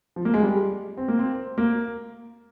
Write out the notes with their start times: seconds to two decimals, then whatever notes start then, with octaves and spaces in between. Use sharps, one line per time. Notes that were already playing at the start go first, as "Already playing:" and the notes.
0.16 F3
0.25 A#3
0.34 G#3
0.43 G3
0.97 C4
1.08 A#3
1.19 C4
1.58 A#3